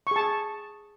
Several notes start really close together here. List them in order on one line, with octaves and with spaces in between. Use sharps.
C#6 G#4 A5